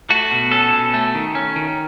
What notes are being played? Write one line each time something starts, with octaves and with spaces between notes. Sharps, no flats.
A3 F#4
B2
C#4 A4
B2
A3
D#3
C#4
D#3